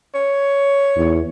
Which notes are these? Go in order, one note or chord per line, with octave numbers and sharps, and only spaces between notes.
C#5
E2